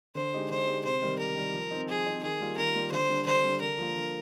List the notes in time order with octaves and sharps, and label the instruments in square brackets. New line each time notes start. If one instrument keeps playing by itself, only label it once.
[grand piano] D3 [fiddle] C5
[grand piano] G#3 D#4 G4
[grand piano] D3 [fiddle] C5
[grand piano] G#3 D#4 G4
[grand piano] C3 [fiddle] C5
[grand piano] D#3 G3
[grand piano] C3 [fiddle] A#4
[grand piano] D#3 G3
F3
C4 D#4
[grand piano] F3 [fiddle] G#4
[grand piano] C4 D#4
[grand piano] D#3 [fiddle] G#4
[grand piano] G3 A#3 F4
[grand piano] D#3 [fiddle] A#4
[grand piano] G3 A#3 F4
[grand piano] D3 [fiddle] C5
[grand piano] G3 D4
[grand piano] D3 [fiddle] C5
[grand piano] G3 D4
[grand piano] D3 [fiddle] A#4
[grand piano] F3 A#3 F4
D3